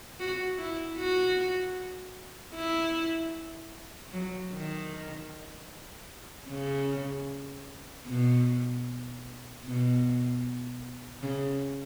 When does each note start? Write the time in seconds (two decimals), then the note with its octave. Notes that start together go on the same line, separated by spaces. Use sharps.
0.19 F#4
0.59 E4
0.99 F#4
2.55 E4
4.13 F#3
4.53 D#3
6.50 C#3
8.07 B2
9.65 B2
11.23 C#3